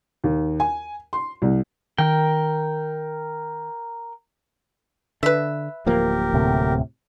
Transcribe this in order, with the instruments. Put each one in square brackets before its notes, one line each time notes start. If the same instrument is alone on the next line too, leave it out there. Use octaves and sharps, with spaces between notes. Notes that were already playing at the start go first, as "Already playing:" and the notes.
[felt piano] D#2
G#5
C6
C2
[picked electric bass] D#3 [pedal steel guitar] A#4 G5
[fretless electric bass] D3 [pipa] B4 E5
[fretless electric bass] D1 F3 A#3 [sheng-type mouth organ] G4 A#4
[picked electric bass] D2 A2 C3